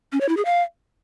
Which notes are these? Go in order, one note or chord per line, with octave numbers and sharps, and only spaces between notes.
C#4
C#5
E4
G#4
F5